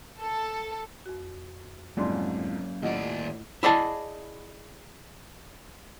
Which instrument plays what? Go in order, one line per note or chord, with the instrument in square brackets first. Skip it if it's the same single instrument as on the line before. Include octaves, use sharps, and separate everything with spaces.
[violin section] A4
[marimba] F2 F#4
[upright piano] C2 F2 G#2 [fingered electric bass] F#3 A#3 C#4 [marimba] D5 C6
[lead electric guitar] D#2 D5 [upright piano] A2 [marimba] F4 D#5 F#5
[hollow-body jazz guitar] E4 G#4 D5 D#5 F#5 A5